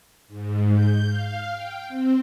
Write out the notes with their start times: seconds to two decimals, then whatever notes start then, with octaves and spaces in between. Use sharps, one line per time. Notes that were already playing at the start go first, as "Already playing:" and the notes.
0.28 G#2
0.72 G6
1.07 F5
1.50 G5
1.88 C4